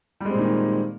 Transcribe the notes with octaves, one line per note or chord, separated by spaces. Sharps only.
A#2 D#3 G3 G#3 C4